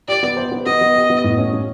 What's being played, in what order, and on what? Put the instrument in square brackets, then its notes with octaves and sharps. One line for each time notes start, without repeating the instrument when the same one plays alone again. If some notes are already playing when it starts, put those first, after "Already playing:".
[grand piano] G4 [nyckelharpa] D5
[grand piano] B3
C5
B3
[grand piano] B3 [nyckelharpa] D#5
[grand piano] B3
G4
B3
A2
C#4
C#4